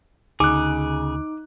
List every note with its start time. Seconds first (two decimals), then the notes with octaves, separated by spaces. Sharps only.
0.40 D2 C#3 D#4 G#4 D6 F#6